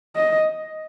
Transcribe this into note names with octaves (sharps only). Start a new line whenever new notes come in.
D#5